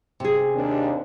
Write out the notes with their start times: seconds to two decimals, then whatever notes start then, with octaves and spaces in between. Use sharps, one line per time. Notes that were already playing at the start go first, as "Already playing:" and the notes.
0.20 C3 G#4
0.54 D#2 C4 D4